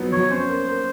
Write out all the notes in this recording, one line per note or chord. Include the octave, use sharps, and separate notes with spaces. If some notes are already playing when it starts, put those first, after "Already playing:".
Already playing: F3 F#3 B3 D#4
F#3 C#5
C#4 C5
A#3
A#3